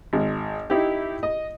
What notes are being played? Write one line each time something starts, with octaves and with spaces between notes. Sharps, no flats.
G#1
D#4 E4 G4
D#5